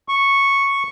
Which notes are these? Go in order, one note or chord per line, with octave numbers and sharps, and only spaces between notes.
C#6